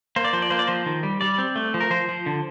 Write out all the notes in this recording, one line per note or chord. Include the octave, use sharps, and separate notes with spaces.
A#3 C5
D5
F3 C5
D5
A#3 C5
D5
F3 C5
D#3
G3
G3 D5
C4
A3
F3
A#4
F3 C5
F3
D3